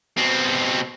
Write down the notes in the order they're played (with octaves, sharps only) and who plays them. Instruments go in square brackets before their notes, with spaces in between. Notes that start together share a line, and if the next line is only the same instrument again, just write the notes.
[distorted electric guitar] B2 C4